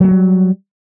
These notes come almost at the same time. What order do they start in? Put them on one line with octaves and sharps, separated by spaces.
F#3 A#3 A3 G3